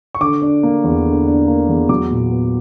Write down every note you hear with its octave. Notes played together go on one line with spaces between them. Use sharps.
C#6
D3 D6
D4
A#3
E2
D3
D4
A#3
E2
F#3 D6
A#2
B3